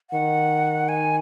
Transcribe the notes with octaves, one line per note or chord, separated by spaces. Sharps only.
D#3 F#5
G#5